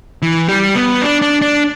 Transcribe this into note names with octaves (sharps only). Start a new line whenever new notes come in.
E3
G3
B3
D4
D4
D4